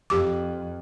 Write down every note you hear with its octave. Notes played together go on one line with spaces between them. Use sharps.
F2 G4 D6